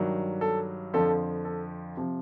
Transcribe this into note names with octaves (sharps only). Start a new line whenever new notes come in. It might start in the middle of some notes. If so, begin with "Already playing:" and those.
Already playing: G2 D#3 F#3
A4
F2 D3 F3 A4
A4
C3 F3